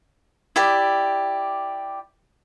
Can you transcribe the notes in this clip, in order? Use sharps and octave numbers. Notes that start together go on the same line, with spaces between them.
E4 G4 D5